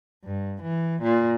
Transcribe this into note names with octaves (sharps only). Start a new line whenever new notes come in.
G2
E3
A#2